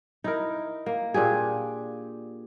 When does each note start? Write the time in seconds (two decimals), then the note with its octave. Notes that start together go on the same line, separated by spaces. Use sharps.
0.24 D#4 E4 A#4
0.86 A#3
1.14 A#2 D4 G4 G#4